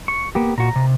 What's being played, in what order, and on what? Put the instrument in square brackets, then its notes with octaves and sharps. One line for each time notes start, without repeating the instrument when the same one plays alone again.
[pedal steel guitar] C#6
A#3 B3 G4
[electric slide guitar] A#2 F#4 [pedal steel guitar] A#5
[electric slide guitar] C3